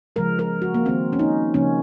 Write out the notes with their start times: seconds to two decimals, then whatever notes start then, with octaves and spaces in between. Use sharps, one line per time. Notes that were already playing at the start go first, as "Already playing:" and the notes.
0.16 C#3 F3 G#3 A#4
0.39 A#4
0.62 F#4
0.74 A#3
0.85 D#3 A#3 C4
1.13 C#4
1.19 D#4
1.54 C#3 F3 A#3 C#4